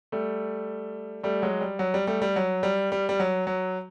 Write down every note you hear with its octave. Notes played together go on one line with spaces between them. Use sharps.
G3 A3
G3 A3
F#3 G#3
G3
F#3
G3
G3 A3
G3
F#3
G3
G3
G3
F#3
F#3